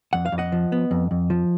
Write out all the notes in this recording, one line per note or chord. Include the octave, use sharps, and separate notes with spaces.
F2 F#5
F5
F2
D#5 F#5
F3
B3
F2
F2
F3